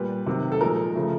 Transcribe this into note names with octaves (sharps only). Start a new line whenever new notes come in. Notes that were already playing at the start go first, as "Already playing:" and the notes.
Already playing: A#2 G3 B4
C3 D#3 F#3
A4
A#2 F3 G#3 A#4
C#3 F3 A3